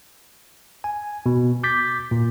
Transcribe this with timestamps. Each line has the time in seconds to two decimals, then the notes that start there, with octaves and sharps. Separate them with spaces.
0.84 G#5
1.26 B2
1.63 D6 G6 A6 B6
2.11 A#2